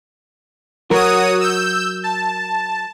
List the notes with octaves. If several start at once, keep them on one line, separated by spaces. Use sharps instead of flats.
F#3 F#4 A#4 C#5 D#6
E6 G6
A5